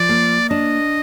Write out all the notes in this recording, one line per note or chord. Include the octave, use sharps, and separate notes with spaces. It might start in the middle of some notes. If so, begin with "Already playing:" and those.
Already playing: F3 D5
A#3
D4 D#5